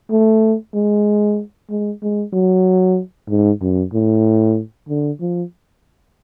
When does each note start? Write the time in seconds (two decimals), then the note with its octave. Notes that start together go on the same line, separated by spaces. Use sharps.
0.11 A3
0.74 G#3
1.70 G#3
2.02 G#3
2.33 F#3
3.29 G#2
3.62 F#2
3.93 A2
4.89 D3
5.21 F3